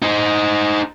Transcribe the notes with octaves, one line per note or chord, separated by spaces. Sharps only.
D#4 C5